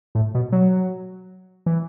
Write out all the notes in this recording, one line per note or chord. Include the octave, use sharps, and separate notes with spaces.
A2
B2
F#3
E3